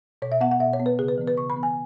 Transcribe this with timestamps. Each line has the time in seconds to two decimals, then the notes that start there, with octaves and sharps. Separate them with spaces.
0.22 B2 C#5
0.32 E5
0.41 B3 F#5
0.51 F#5
0.60 B2 E5
0.73 C#5
0.80 B3
0.86 B4
0.99 C#3 G#4
1.08 B4
1.18 E3 B3
1.28 B4
1.37 C#3 C#6
1.50 B5
1.57 E3 B3
1.63 G#5